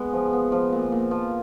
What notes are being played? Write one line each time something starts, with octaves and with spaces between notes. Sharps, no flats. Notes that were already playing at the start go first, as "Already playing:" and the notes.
Already playing: G#3 B3
F3
B3
F3
A#2
A#2
F3